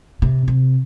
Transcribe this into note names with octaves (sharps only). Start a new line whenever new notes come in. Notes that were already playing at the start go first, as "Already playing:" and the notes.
C3
C3